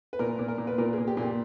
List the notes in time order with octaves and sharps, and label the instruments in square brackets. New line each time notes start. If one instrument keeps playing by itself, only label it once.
[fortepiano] B4
A#2 A#4
A#2
A#4
A#2
B4
A#2 A#4
G#4
A#2
G4
A#2
G4